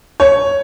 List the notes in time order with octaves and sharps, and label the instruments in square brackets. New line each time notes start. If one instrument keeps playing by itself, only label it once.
[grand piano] C#5